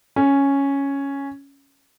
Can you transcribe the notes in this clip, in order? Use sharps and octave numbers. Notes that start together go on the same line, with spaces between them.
C#4